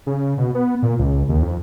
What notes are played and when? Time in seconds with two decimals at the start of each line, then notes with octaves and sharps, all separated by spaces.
0.07 C#3
0.37 B2
0.55 B3
0.82 A#2
0.99 C#2
1.29 D#2
1.42 F2